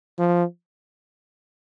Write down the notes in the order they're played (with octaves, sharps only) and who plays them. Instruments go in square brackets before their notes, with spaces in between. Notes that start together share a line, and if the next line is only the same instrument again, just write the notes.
[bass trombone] F3